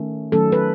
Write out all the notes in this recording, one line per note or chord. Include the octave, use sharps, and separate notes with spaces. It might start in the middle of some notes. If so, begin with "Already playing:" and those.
Already playing: D#3 A3 C#4
D#3 F#3 A3 C#4 A4
B4